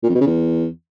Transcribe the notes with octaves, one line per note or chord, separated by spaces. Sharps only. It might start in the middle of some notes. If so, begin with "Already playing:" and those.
A#2
F2
B2
C#3
E2